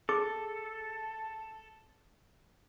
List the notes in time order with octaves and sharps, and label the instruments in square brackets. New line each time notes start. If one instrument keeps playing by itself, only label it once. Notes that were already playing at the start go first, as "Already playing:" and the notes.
[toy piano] G#4 D6 [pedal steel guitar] A4